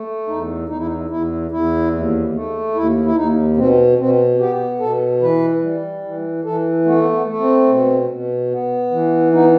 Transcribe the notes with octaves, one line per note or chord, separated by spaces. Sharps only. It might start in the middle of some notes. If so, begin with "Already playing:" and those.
Already playing: A3
E2 D#4
E2 D#4
E4
D#4
E2 E4
E2 E4
D#2
A3
D#2 E4
E4
D#2 D#4
B2 C4
B2 C4
B3 G4
B2 A4
E3 B4
G3
E3
E3 A4
A3 B3
B3
B3
A3
C4
B2
B2
B3
E3
B3 D#4